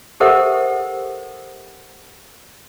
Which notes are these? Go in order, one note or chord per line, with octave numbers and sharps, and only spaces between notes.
G4 A4 A#4 C5 E5 F#5